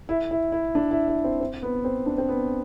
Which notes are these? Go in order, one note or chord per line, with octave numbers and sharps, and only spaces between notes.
E4
E4
E4
D4
E4
E4
C4
C4
B3
C4
D4
C4
B3